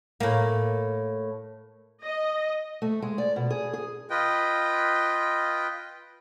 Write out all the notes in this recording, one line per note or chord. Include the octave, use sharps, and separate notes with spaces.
A2 A#3
D#5
A3
G#3
D5
B2
G#4
G#4
F4 B4 D#5 G5